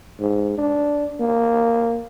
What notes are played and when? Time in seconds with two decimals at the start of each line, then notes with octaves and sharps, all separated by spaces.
0.20 G#2
0.58 D4
1.20 A#3